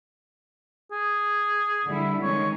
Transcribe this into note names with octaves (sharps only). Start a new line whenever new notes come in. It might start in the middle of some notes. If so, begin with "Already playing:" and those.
G#4
D3 G3 E4
D#3 G#3 C#4 C#5